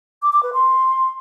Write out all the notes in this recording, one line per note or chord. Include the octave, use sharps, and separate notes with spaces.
D6
D6
B4
C6